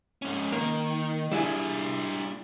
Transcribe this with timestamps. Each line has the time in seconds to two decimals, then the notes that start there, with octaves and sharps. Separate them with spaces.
0.22 G#2 C#4
0.53 D#3 A#3
1.32 G3 D4 E4 F4 G#4